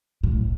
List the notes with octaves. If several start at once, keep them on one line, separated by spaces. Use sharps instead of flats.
A2